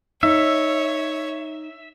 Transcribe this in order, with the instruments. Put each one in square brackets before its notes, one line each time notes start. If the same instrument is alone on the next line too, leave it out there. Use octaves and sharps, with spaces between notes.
[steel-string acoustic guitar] D#4 [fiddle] C#5 [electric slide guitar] E5